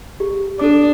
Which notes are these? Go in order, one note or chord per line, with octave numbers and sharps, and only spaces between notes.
G4
D4 A4 D6